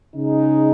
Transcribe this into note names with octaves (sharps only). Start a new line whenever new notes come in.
C#3 G#3 D#4